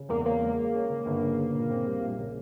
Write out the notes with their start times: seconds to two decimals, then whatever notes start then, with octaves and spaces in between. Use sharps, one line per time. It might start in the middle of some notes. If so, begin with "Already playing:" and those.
Already playing: C#3
0.09 E2 A#3
0.25 A#3 C#4
0.41 G#3
0.57 G#3
0.74 C#4
0.90 C#3
1.06 G1
1.22 C#3
1.38 G1
1.54 A#2
1.70 C4
1.87 G3
2.02 A#1
2.18 C#3